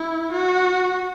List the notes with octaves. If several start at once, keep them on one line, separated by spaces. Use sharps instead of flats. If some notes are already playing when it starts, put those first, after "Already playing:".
Already playing: E4
F#4